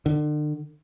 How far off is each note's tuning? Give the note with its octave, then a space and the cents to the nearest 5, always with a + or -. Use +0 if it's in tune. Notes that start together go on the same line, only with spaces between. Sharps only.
D3 +40